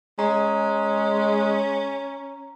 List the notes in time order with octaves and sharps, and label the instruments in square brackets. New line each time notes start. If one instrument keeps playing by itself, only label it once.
[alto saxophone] G#3 [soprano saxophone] C#4 [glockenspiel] A#5